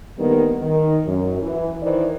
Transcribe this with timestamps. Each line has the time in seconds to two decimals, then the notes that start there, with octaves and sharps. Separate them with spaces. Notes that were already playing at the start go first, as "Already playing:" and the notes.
0.18 D3 D#3 G3 A#3 B3
0.61 D#3
1.06 F#2
1.42 E3
1.82 D#3 E3 C5 D5